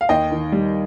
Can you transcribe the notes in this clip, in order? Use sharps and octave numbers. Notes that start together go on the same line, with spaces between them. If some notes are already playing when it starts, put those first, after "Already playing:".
F5
D#2 D#5 G5
D#3
G3